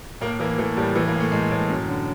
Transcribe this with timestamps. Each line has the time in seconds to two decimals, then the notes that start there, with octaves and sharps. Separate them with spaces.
0.21 A2 A#3
0.40 E3 A#3
0.58 E3 A3
0.77 A2 G3
0.95 E3 A3
1.08 A#3
1.14 A2
1.20 A3
1.32 A2 G#3
1.51 A2
1.69 F#2
1.88 D3